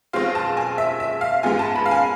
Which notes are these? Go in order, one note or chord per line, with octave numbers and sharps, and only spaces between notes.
B1 B2 G#3 C4 F4 F5
A5
G#5
E5
E5
F5
G#2 G#3 B3 F4 G#5
A5
B5
F5
G#5